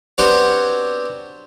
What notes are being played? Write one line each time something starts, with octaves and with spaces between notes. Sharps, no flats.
B3 C4 D4 F#4 G4 C#5